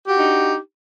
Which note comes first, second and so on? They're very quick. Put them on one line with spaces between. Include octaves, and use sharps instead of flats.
G4 F#4 D4 D#4